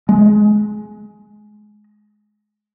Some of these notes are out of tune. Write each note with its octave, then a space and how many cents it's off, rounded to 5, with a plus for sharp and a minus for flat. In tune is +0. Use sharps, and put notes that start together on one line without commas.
G#3 +15